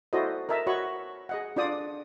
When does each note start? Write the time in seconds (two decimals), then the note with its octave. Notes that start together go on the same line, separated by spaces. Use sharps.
0.13 E4 F#4 A4 C5 D5 D#5
0.49 A#4 D#5 E5 A5
0.67 F#4 C#5 D#5 B5 C#6
1.29 G#4 D#5 F#5
1.56 D4 F4 D5 D#6